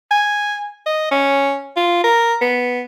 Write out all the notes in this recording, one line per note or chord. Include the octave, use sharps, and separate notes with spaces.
G#5
D#5
C#4
F4
A#4
B3